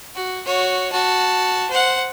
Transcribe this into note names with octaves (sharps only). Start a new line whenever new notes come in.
F#4
F#4 C#5
F#4 A5
C5 F#5